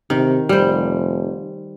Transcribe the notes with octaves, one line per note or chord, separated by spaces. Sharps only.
C3 D#3
F1 G3 C5